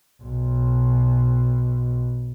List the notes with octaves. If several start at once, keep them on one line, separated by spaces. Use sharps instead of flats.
B1 B2